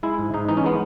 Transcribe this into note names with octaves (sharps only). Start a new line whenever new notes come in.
G#3 E4
G#2
G#2 D#4
E3 D#4
C#4
G#3 B3